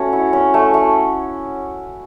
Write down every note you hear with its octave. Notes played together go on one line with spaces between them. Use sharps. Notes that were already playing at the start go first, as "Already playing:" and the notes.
Already playing: A3 C#4 F#4 C#5
E4
C#4
A3
A3